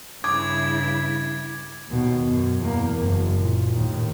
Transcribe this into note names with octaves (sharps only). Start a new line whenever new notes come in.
G2 C#3 E4 D6 G#6
D#2 B2
F#2
E2 A#3
F#1 F#2
A#2
D#2 A2